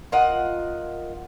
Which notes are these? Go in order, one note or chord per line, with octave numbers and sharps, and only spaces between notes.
F4 A#4 D#5 F#5